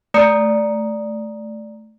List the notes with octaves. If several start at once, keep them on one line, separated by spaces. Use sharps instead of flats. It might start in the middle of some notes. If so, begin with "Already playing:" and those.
A3 D5 A#5 D#6 C#7